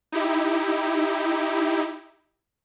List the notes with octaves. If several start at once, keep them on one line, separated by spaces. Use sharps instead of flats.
D#4 E4 G4